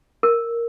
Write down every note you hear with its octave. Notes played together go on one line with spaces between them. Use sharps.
A#4